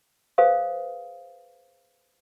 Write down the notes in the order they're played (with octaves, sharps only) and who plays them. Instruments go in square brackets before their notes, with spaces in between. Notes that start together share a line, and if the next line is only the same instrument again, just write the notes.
[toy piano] G#4 B4 C5 F5 D#6